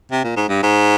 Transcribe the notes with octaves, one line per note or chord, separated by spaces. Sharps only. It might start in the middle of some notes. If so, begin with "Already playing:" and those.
C3
A#2
G#2
G2
G#2